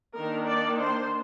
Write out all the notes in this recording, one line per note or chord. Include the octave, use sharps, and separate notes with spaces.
D#3 A#3 D4 A#4
D5
C5